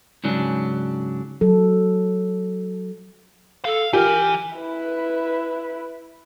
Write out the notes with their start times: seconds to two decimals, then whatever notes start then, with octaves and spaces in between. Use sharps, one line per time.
0.24 G#2 C#3 F#3 D4
1.41 F#3 A4
3.65 A4 F5
3.93 E3 G4 A#4
4.57 E4 B4